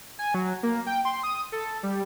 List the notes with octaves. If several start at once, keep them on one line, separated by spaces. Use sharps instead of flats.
G#5
F#3
A#3
G5
C6
D#6
A4
G3